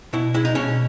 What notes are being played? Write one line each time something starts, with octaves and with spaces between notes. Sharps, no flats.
B2 E4
G#3 E4
D#4
B2 C#4